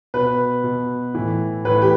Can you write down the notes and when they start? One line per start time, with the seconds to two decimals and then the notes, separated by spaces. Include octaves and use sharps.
0.14 B2 B4
0.64 B2
1.14 A2 E3
1.65 A2 E3 B4
1.82 G4